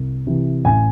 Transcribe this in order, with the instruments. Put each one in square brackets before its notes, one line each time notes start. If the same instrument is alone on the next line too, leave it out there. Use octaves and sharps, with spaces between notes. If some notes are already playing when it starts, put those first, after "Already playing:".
Already playing: [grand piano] C2
C3 E3
A1 G#5